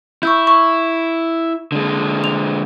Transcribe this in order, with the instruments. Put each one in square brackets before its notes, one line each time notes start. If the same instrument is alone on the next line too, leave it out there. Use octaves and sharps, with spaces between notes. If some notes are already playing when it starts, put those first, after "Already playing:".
[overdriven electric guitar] E4 [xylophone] C#6 E6 G6
[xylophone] C#6
[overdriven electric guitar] D3 G#3
[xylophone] F7